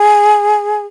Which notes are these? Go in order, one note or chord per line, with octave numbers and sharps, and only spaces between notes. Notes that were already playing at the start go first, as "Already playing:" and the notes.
Already playing: G#4